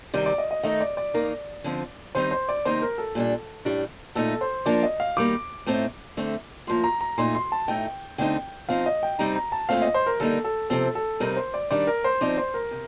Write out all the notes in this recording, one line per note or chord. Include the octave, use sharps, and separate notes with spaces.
C3 D#3 G3 C4 D5
D5
D#5
D#5
D#3 A3 D#4 D#5
D5
D5
D#3 A#3 D#4
D3 F3 C4 D#4
D#3 G3 C4 D#4 C5
C5
D5
C3 D#3 A#3 D#4 C5
A#4
A4
A#2 G3 D4
A2 G3 D4
A#2 A3 D#4 A4
C5
F3 A#3 D4 D5
D#5
F5
D#3 G3 A#3 D6
A2 A3 C4 D#4
D3 A3 C4
A2 F3 A#3 C6
A#5
A#5
A#2 A3 D#4 C6
C6
A5
A2 A3 D#4 G5
D3 A3 C4 D#4 G5
F3 C4 D#4 F5
D#5
G5
C3 G3 C4 D#4 A#5
A#5
A5
A#2 A3 C4 F5
D#5
C5
A#4
D3 G3 A#3 D#4 A4
A4
C3 F3 C4 A4
A4
C3 G3 C4 D#4 A#4
C5
D5
D#3 G3 D4 D5
A#4
C5
F3 C4 D#4 D5
C5
A#4
C3